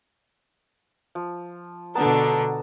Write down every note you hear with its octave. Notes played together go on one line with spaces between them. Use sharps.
F3
B2 D3 B3 D4 A5 A#5